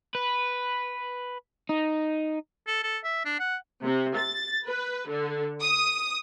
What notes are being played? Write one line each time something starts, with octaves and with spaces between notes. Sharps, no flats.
B4
D#4
A4
A4
E5
D4
F#5
C3
A6
B4
D3
D#6